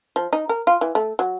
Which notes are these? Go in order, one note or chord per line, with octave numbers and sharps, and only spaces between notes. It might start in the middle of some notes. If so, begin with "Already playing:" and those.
F3
D#4
A#4
F4
E3
A3
F#3